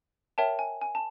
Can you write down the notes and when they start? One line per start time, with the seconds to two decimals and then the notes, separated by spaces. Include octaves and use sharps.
0.38 A#4 C#5 E5 G5 A5
0.59 G#5
0.81 G#5
0.95 A5